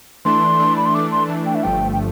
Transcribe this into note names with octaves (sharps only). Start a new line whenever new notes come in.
E3 A3 D4 C6
E3 A3 D4
B5
C6
E3 A3 D4 D6
C6
E3 A3 D4 A5
G5
E5
G1 G2 F3 A3 G5
G5